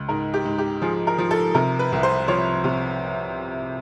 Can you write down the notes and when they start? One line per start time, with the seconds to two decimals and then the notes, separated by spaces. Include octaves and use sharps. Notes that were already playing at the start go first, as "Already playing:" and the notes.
Already playing: C#2
0.08 G#2 A#4
0.34 G4
0.45 G#2
0.58 G4
0.82 F3 G#4
1.07 A#4
1.18 F3
1.31 A4
1.54 C3 A#4
1.79 B4
1.92 C2
2.03 C5
2.28 F3 C#5
2.64 C3